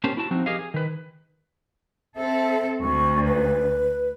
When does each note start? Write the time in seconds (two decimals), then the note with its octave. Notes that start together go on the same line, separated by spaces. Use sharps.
0.04 A#3 C#4 G4 C5 A5
0.17 E4 F#4 A5
0.31 F3 C4 D#4 F#4
0.46 G4 G#4 A#4 D#5 F5
0.59 G#4
0.74 D#3 B4
2.16 C4 A4 E5
2.81 D2 C#6
3.25 B4